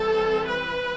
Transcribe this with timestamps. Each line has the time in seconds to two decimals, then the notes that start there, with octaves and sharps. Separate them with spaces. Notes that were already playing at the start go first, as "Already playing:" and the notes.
Already playing: E3 G3 C4 A4
0.47 B4